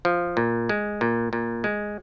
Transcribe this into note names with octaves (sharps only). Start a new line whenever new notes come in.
F3
A#2
G#3
A#2
A#2
G#3